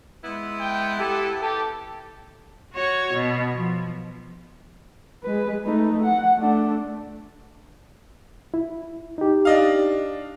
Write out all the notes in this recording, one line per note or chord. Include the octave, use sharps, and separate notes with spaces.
G#3 B3 E4
G5
G4 A4
G4 A4
F#4 C#5
B2
F3
G#3 B4
A3 D#4
F#5
A3 D4
E4
D#4 G4
D4 D#5 F5